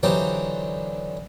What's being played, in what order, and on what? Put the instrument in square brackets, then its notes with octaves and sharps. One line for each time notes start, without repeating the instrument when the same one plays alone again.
[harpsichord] D3 E3 F#3 D#4 G4 C5